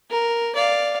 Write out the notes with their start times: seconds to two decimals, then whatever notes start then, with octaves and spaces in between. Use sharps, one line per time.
0.10 A#4
0.55 D5 F5